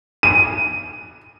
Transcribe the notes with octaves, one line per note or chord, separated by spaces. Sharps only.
D#7